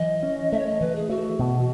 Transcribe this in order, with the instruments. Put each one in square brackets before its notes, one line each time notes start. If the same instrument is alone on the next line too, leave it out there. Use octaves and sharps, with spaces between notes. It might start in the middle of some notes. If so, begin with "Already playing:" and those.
Already playing: [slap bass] E3 F#3 [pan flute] D#5
[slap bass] C#4
[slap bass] A3 [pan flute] E5
[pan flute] C#5
D#5
[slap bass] E3 [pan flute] B4
[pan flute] G#4
[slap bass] A3 [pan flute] F#4
[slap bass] B2